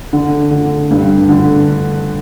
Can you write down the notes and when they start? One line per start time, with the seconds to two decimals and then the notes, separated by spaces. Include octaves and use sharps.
0.13 D3
0.51 D3
0.91 G2
1.29 D3